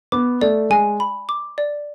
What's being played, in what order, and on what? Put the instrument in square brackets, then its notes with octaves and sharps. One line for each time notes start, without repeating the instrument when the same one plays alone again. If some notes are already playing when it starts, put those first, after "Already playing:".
[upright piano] B3 [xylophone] D6
[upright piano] A3 [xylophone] D5
[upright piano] G#3 [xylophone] G#5
[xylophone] B5
D6
D5